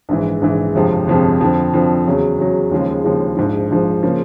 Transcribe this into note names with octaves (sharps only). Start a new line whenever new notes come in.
A#1 G#2 E3
A#1 G#2 E3
G1 F2 C3 F3 G#3
G1 F2 C3 F3 G#3
F2 D3 F3
F2 D3 F3
E2 C#3 F#3
E2 C#3 F#3
D#2 C#3 F3 G#3
D#2 C#3 F3 G#3
A#1 G#2 F3
A#1 G#2 F3
C#3 F3 A#3